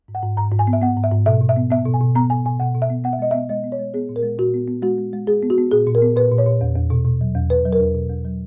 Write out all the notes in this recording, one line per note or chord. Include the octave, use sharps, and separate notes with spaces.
G#2
F#5
G#2
G#2 A#5
G#2
G#5
B3
E5
B3 F#5
G#2
E5
G#2
B2 E5
B2
E5
B3
B3 E5
B2
G#5
B2
B3 A#5
B2 G#5
B2 G#5
B2 F#5
B2
E5
B3
B3 F#5
E5
G#3 D#5
B3 E5
G#3 D#5
B3
C#5
G#3
B3 G#4
A#2
A#4
G#3
A#2 F#4
B3
B3
G#3 F#4
G#3
G#3
G#3 G#4
B3
F#4
B3
A#2 G#4
A#2
A#4
B3
A#2 B4
A#2
C#5
A#2
E2
E2
B2
B2
F#3
E2
E2 B4
F#3
A#4
E2
B2
E2
F#3